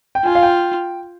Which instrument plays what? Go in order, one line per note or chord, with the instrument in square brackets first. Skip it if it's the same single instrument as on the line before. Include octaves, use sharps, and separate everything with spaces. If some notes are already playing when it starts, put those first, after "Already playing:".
[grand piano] G5
[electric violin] F4 [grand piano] G#5
[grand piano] F5
G5